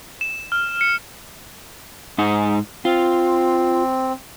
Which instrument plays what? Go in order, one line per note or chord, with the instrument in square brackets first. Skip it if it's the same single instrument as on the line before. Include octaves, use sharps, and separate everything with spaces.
[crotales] E7
F6
C#7
[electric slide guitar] G#2 D#4
[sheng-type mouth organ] C4 [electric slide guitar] F4